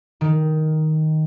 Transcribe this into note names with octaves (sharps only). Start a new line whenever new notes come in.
D#3